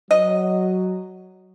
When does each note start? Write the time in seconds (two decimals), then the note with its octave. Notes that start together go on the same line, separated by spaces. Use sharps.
0.11 F#3 D#5